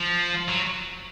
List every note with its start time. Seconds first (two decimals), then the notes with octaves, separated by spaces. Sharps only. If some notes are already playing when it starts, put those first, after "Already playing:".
Already playing: F3
0.48 F#3